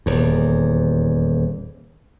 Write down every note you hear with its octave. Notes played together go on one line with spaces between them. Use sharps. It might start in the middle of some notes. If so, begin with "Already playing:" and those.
D#1 E2